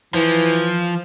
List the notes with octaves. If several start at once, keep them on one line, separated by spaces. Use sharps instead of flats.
E3 F3